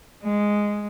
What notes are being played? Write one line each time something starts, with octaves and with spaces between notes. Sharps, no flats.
G#3